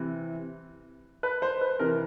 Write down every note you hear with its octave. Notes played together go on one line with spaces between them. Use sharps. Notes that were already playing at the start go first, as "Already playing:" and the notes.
Already playing: C3 E3
B4
C5
B4
C3 E3 A#4